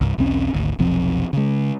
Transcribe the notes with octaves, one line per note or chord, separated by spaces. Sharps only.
C2 G2
B1 E2 C4 C#4
G#1 D2
F1 B1 F3 C4
C#3 G#3